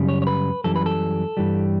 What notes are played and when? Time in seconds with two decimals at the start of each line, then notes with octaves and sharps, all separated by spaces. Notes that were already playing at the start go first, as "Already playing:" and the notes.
Already playing: F#2 C#3 G3
0.09 C#5
0.22 C#5
0.27 B4
0.64 F#2 E3 G3 A4
0.76 B4
0.86 A4
1.37 G2 E3 G3